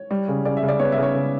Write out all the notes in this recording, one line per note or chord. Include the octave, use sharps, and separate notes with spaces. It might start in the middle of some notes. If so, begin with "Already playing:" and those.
Already playing: C#5
G3
C#3
C#3 D5
E5
C#3
D5
B3 C#5
E5
C#3
C#5
C#3